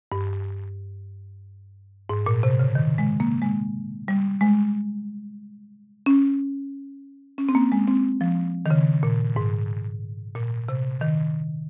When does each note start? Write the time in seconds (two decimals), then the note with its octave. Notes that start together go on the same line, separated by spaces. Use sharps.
0.12 G2
2.09 G#2
2.26 A#2
2.43 C3
2.59 C#3
2.75 D#3
2.98 G#3
3.20 A#3
3.42 G#3
4.08 G3
4.41 G#3
6.06 C#4
7.38 C#4
7.49 C4
7.55 A#3
7.72 G#3
7.87 C4
8.21 F3
8.66 D#3
8.71 C#3
9.03 A#2
9.36 G#2
10.35 A#2
10.69 C3
11.01 D#3